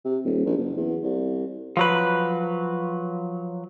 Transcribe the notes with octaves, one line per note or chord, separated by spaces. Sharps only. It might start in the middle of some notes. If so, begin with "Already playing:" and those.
C3
D#1
A#1
F#1
E2
C2
F3 F#3 B4